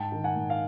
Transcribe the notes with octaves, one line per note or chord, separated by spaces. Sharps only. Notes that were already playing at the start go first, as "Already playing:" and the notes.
Already playing: G#2 G5 A5
D#3
F#5 G#5
G#2
F5